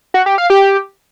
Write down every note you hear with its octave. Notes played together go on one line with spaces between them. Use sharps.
F#4
G4
F5
G4